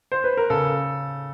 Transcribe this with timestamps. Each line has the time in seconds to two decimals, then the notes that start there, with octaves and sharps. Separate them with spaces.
0.12 C5
0.24 B4
0.37 A#4
0.50 C#3 A4